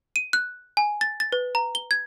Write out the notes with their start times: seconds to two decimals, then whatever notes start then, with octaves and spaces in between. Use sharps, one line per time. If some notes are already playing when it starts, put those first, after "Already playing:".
0.16 D#7
0.33 F#6
0.77 G#5
1.01 A6
1.20 A6
1.32 B4
1.55 A#5
1.75 G7
1.91 G#6